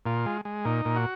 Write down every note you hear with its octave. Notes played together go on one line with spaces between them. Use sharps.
A#2 F4
G#3
G#3
A#2 D#4
A#2
F#4